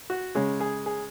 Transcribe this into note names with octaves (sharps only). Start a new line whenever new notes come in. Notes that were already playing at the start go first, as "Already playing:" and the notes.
F#4
C#3 G#3 C#4
G#4
G#4